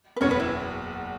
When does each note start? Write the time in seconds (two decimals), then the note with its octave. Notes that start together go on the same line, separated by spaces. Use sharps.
0.16 B4
0.21 F#1 E2 B2 B3 C#4 C#5
0.31 B4
0.40 E4